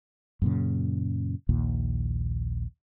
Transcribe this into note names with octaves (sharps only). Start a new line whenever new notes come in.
F#2 A#2 C#3
A#1 D#2 A#2